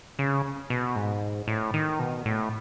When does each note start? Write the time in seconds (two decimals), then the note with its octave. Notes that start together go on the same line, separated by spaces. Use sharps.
0.19 C#3
0.70 B2
0.96 G#2
1.48 A2
1.74 D#3
1.99 B2
2.26 A2